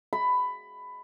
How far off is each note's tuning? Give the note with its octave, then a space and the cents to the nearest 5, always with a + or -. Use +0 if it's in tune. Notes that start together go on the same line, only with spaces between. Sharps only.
B5 +15